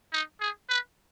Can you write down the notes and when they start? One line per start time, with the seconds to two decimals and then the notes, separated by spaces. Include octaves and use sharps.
0.13 D#4
0.41 G#4
0.69 B4